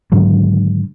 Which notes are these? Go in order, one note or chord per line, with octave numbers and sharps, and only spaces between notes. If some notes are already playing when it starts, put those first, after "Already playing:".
G#2 D3 D#3 F#3